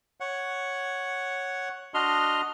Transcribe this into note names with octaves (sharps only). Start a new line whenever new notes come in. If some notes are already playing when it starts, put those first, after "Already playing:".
C#5 F#5
D4 F#4 D#5 C6 F6